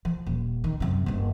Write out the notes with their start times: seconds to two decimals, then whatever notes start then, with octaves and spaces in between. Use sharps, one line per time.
0.05 F3
0.26 D#1
0.64 D#3
0.80 F#2 C3
1.06 F#1 G2